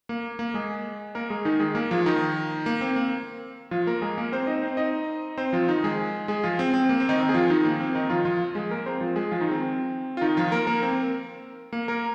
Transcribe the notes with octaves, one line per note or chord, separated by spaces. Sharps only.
A#3
A#3
G#3 G#4
A#3 A#4
G#3 G#4
D#3 D#4
G#3 G#4
A#3 A#4
F3 F4
D#3 D#4
A#3
C4
A#3
F3 F4
A#3 A#4
G#3 G#4
A#3 A#4
C4 C5
D#4 D#5
C4 C5
D#4 D#5
C4 C5
F3 F4
D#3 D#4
G#3 G#4
G#3 G#4
F3 F4
C4
C4
A#3
C4
D#3 D#4
C4
G#4
F3 F4
D#3 D#4
A#3
C4
D#3 D#4
F3 F4
F3 F4
G#3 G#4
A#3 A#4
C4 C5
F3 F4
G#3 G#4
F3 F4
D#3 D#4
C4
F4
D#3 D#4
F3 F4
A#3 A#4
A#3 A#4
C4
A#3
A#3 A#4